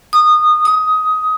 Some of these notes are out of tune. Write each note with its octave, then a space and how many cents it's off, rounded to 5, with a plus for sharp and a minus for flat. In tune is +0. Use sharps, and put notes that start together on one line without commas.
D#6 -20
D#6 +15